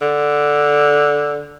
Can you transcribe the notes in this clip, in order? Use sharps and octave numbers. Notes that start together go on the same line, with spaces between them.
D3